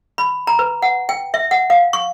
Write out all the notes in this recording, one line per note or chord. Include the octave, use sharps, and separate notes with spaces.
B5
A#5
B4
F#5
G5
E5
F#5
F5
C#6